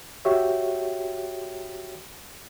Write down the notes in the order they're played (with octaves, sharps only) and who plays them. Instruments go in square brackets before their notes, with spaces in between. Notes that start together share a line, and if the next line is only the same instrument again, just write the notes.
[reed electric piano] F#4 G4 C#5 E5 G5